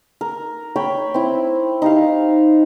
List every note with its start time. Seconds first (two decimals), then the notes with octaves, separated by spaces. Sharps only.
0.21 A#4
0.76 C#5 G5 B5
1.14 C4 E4
1.82 D#4 G4 F5